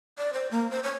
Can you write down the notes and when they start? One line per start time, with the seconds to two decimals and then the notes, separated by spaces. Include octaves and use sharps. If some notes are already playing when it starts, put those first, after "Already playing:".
0.18 D5
0.33 C5
0.51 A#3
0.71 C5
0.83 C#5